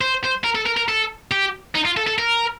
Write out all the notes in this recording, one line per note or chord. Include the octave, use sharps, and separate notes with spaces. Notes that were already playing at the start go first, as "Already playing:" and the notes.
C5
C5
A#4
A4
A#4
A#4
A4
G4
D#4
F4
A4
A4
A#4